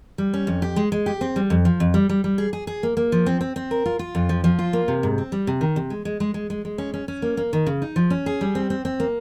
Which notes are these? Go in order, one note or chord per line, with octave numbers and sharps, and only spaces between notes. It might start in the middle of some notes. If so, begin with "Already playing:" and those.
G3
C#4
F2
G4
G#3
G#3
G4
C4
G3
F2
F3
F2
G3
G3
G3
G#4
G#4
G#4
A#3
A#3
F3
C4
C4
C4
A#4
F4
F4
F2
F3
F3
F4
A#3
C3
G#2
C4
G3
C3
D#3
C3
G#3
G#3
G#3
G#3
G#3
G#3
C#4
C#4
C#4
A#3
A#3
D#3
C#3
D#4
F3
C#4
G#4
G3
C4
C4
C4
A#3